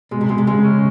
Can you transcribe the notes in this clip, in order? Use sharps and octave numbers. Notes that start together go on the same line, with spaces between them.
B2 G#3
C3
B2 G#3
C3
C#3 G#3
C#4